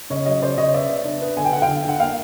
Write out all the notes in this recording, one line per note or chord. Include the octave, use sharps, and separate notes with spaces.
C#3 C#5 D#5
F#3 C#5 D#5
C#3 C5 D5
C#3 C#5 D#5
B3 D5 E5
B3
D4
B3
D3 G#5
G5
D3 F#5
F5 G5
D3
D3 F#5
A#3 F5 G5